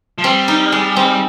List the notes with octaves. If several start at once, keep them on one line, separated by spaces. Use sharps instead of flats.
F3
G3 C4
D#4
G#3
C4